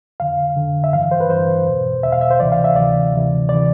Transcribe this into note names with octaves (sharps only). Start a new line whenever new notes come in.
F2 D3 F5
F2 D3
E5
G2 E3 F5
C5
B4
G2 E3 C5
E2 B2
E2 B2 E5
F5
E5
C5
D2 C3 E3 D5
F5
E5
D2 C3 E3 D5
D2 C3 E3
C3 E3 D5